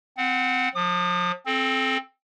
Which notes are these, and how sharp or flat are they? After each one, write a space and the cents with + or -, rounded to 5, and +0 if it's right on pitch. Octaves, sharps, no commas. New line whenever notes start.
C4 -20 F#5 -10
F3 +40 D#6 -45
C4 +10 A4 -30